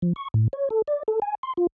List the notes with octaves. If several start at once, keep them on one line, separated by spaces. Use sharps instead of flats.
F3
C#6
A2
C#5
A4
D5
A4
G#5
C6
F4